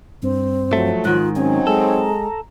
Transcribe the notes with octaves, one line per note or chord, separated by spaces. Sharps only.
G2 C4
F3 F#3 A3
G#2 D#3 F4 F#6
F#3 C4 C#4 D#4 G#5
G#3 A4
A#5